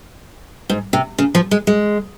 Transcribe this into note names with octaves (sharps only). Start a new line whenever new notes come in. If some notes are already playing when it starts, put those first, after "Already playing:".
G#2
C3
C#3
F3
G#3
G#3